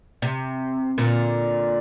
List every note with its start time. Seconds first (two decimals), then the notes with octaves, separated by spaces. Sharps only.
0.22 C3
0.98 A#2 D3